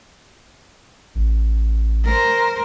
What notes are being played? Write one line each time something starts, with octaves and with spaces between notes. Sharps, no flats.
A1
A#4 C5